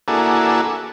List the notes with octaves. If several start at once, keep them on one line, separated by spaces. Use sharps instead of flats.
A#3 D4 E4 F#4 G#4 A4